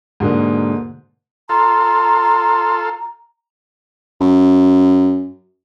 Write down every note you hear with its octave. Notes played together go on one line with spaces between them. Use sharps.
G#2 B2 D3 A#3
F4 A4 A#5 C6
F#2